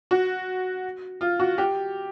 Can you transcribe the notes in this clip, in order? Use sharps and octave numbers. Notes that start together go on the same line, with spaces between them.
F#4
F4
F#4
G4